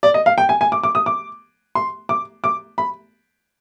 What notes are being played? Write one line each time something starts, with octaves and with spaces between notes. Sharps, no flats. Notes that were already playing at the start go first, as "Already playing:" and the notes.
D5
D#5
F5
G5
G#5
G#5
D6
D6
D#6
D6
C6
D6
D6
B5